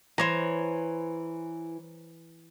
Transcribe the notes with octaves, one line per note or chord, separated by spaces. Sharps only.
E3 C5 C#5 A#5